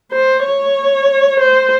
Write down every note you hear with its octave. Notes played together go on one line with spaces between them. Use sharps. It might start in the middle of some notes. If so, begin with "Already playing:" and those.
C5
C#5
C5